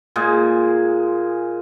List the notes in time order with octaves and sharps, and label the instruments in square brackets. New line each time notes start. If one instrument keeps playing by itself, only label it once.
[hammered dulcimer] A#2 G#3 G#4 G#5